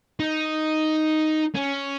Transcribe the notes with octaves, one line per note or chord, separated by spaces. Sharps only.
D#4
C#4